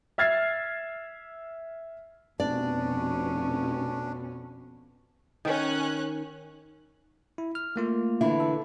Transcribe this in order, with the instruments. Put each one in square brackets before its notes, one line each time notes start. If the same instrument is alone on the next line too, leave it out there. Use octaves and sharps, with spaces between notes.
[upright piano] E5 F6 G#6 A6 C7
[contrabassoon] F1 [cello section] F2 B2 C#4 [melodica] D4 [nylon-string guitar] D5
[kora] D#3 [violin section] C#4 F#6
[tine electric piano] E4
F6
A3 A#3 F4
[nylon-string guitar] D3 E3 E4
[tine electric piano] A4